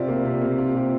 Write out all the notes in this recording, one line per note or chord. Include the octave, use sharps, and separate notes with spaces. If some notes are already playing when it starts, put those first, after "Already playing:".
Already playing: C3 F4 D5
A#3
C3
A#3
F4
C3